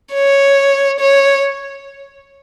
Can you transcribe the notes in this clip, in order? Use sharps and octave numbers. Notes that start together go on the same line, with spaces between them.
C#5
C#5